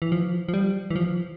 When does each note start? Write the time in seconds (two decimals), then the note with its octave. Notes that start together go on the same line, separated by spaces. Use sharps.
0.02 E3
0.12 F3
0.49 F3
0.54 G3
0.90 E3
0.96 F3